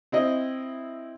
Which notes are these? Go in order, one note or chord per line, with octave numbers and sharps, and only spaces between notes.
C4 E4 D#5